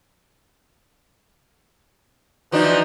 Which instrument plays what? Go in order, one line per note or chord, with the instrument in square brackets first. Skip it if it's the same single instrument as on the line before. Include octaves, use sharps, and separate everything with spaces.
[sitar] E3 F3 D4 [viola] D#4 F#4